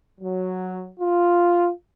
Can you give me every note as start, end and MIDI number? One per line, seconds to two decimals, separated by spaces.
0.21 0.88 54
1.00 1.70 65